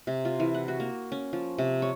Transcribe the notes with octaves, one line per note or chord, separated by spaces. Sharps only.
C3
F4
E3
F#5
F#4
A#3
C#4
F3
C3
C#5